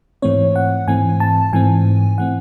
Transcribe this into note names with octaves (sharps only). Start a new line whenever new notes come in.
G#2 E3 A3 C4 C#5
F#5
G#2 E3 A3 C4 G#5
A5
G#2 E3 A3 C4 G#5
E3 A3 C4 F#5